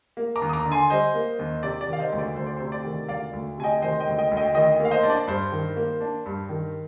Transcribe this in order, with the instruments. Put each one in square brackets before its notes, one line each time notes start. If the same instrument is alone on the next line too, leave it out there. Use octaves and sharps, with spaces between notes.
[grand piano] A#3
A#5 D6
D#2
D#6
A#5 D6
D3
G#5 C6
G3 C5 D#5
A#3
D#2
C3 D5
D5
D#3 F5
C5 D#5
D2
D5
D2 C5
D5
C3 C5
D5
D#3
D2 D5 F5
D2
C3 G#5
D#5 G5
D#3 C5 D#5
D#5 G5
D2
D#5 G5
D2
D#5 G5
D#3 D#5 G5
A#3
F5
C5 D#5
D4
D5
G2 C5
D#3
A#3
D4
G2
D#3